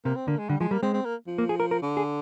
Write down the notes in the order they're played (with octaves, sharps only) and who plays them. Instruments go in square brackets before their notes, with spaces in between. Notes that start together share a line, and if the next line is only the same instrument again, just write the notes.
[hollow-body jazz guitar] C3 [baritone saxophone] A#3
[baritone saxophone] C4
[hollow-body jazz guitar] D3 [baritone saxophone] A#3
[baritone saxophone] G#3
[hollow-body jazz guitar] D3 [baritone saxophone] G3
[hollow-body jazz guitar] F3 [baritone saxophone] G#3
[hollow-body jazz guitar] G3 [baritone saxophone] A#3
[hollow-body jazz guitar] G#3 [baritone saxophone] C4
[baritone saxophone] C4
A#3
F3
[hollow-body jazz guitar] A#3
G#4
A#4
A#4
[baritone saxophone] D3
[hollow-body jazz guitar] G#4